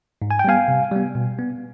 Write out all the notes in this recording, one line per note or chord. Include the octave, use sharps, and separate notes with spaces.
G#2
G#5
G5
G3 B3 F5 G#5
C3
G3 B3
B2
B3